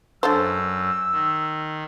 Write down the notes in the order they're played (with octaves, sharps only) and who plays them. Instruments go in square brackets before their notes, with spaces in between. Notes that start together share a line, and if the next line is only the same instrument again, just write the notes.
[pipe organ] F#2 [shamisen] D4 A4 C5 [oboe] E6
[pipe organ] D#3